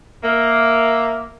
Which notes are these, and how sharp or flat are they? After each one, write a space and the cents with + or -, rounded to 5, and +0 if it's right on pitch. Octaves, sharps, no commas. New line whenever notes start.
A#3 +0 E5 +0